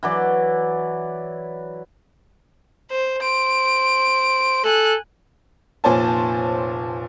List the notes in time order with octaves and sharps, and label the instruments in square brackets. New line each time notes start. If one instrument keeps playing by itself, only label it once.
[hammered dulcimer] E3 F#3 D5
[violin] C5
[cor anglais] C5 [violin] D7
[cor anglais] A4 [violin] G#5 F#6
[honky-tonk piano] F1 A#2 C5 C#5 G#5 A5